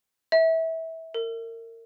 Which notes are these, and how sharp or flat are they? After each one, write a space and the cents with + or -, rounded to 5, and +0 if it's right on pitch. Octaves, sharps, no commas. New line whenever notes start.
E5 -20
A#4 -30